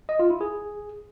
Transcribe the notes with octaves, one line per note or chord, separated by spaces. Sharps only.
D#5
F4
E4
G#4